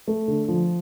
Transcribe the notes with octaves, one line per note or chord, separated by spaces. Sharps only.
A3
D3
F3